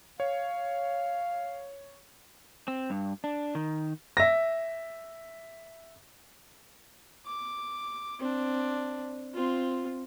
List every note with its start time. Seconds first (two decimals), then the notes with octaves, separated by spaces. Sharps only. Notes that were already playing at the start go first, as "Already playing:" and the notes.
0.20 C#5 F5
2.68 C4
2.90 G2
3.24 D4
3.55 D#3
4.17 E5 A#6
7.26 D6
8.20 C4 D4
9.34 C4 F4